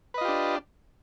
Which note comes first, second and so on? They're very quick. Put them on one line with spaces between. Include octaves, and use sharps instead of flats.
B4 D#5 F4 G4 D4